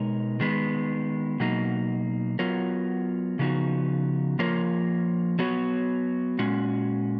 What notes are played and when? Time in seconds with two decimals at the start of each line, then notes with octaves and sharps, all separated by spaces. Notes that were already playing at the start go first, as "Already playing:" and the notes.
Already playing: B2 G#3 D#4 A#4 C#5
0.40 D#3 G#3 B3
1.40 B2 F#3 A#3 D#4
2.39 F#3 B3 F4 A#4 C#5
3.39 C#3 F3 B3 D#4 F#4
4.39 F3 A#3 F4 A#4 C#5
5.39 F#3 B3 F#4 C#5
6.39 A#2 G#3 C#4 F#4